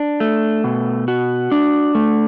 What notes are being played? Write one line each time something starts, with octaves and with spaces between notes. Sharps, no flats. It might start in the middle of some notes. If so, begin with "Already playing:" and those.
Already playing: D4
A3
B2
F#4
D4
A3